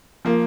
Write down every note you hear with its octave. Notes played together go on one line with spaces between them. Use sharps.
F3 A#3